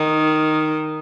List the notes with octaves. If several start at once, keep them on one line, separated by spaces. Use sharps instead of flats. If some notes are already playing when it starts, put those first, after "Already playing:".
Already playing: D#3